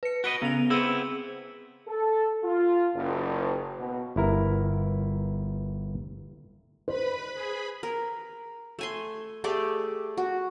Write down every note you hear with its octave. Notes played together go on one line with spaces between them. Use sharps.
B4 C#7
F#4 B4 D#5 A#6 D7 G7
C#3 B3 F7
B3 C4 E4 G#4 E6
A4
F4
F#1
B2
G1 E4 A#4
B4 C5 B5
G#4 B5
A#4
A3 G#5 C6
A3 G4 G#4 D5
F#4